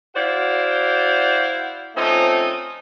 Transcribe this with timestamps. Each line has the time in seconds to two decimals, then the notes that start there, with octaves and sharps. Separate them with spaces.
0.15 E4 F#4 C5 D5 F5
1.96 F3 A3 C4 C#4 D#4